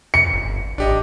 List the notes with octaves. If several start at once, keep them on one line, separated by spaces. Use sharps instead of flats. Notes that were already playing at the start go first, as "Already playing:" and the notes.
F2 C#7
G1
A1 D4 G4 D#5